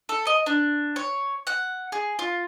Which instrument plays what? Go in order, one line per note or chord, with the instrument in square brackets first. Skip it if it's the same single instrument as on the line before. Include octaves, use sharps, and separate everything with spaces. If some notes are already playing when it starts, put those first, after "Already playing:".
[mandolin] A4
D#5
D4
C#5
F#5
G#4
F4